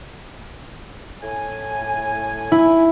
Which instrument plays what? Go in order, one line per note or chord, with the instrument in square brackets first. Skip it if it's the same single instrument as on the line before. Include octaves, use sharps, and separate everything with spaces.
[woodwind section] A2 G#5
[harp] E4